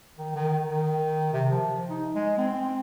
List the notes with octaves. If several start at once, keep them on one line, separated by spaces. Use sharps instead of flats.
D#3
D#3
D#3
C3
F3
D#4
G#3
C4